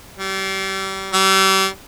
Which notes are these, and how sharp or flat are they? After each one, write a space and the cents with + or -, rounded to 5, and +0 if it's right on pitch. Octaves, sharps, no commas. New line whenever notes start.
G3 -30
G3 -35